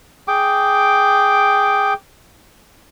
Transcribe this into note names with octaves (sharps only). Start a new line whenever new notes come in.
G#4 G5 D6